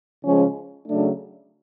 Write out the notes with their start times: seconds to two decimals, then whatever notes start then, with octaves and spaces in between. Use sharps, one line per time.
0.24 C#3 F3 G#3 C#4
0.88 C#3 F#3 A3 D4